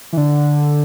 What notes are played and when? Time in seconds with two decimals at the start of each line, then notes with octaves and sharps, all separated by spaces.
0.13 E3
0.17 D3